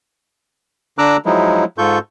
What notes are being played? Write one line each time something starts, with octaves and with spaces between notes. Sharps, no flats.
D3 D4 A#5 D6 E6 F#6
F3 F#3 G#3 D#4 E4
G#2 F4 A4 C#6 G6